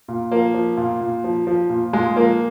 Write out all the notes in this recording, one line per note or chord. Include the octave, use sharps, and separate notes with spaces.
A#2
F3 A#3
F3
A#2
A#2
F3
F3
A#2
A#2 G#3
F3 A#3